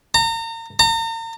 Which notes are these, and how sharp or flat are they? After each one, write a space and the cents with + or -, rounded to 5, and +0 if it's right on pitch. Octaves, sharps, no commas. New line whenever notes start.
A#5 -35
A#5 -40